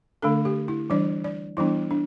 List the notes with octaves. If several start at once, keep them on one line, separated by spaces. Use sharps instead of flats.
D3 A3 D4 A4
G4
E4
E3 G3 D4 D5
D5
E3 G3 B3 D4 E4
D4